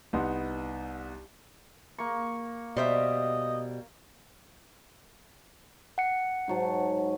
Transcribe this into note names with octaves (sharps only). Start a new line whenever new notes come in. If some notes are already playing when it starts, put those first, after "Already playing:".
C2 B3 D#4 F#5 C6
A#3 C#6
B2 G3 C5 D#5 E5
F#5 C#7
G#2 F#3 A5